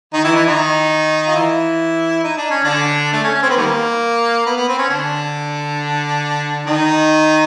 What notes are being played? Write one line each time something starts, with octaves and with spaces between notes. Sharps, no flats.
D#3 D#4
E3 E4
E3 E4
D#3 D#4
F4
E3 E4
D#4
D4
C#4
D3 D4
A3
C#4
C#4
C4
B3
D#3 G3 A#3
B3
B3
C4
C#4
D3 D4
D#3 D#4